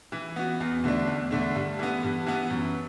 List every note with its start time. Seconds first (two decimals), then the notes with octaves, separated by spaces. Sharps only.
0.12 E3
0.36 B3 F#4
0.60 E2
0.84 D3 A3 D4
1.07 E2
1.31 D3 A3 D4
1.55 G2
1.79 E3 B3
2.03 G2
2.26 E3 B3
2.50 F#2